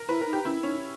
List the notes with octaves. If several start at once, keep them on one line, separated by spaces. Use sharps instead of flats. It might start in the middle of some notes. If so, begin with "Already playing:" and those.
Already playing: A#4
E4 B4
A#4
D#4
G4
C#4 E4
C#4 D#4